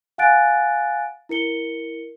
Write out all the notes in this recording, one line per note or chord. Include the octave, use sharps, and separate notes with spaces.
F5 F#5 G#5 F#6 A6 D7
E4 A#4 C#7 G7